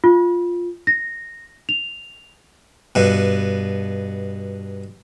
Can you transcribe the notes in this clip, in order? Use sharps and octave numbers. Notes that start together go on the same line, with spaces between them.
F4
A#6
F7
G2 B2